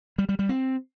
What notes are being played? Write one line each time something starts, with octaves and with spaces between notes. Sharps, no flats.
G3
G3
G3
C4